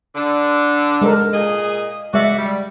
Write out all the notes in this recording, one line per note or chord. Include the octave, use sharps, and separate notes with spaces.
D3 D4
G#3 A4 A#4
A#2 G#4 D#5
G#3 F#4 D5 E5
G3